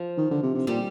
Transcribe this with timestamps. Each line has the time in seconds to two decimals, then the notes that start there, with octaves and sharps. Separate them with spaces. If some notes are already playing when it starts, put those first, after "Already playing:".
Already playing: F3
0.17 D#3
0.31 D3
0.43 C3
0.55 C3
0.67 A#2 G3